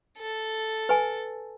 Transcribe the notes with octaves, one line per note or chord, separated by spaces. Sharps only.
A4
B4 G#5